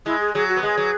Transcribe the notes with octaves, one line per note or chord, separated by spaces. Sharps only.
G#3 E4
G#4
F#3 G#4
F#4
B3
G#3 G#4
F#3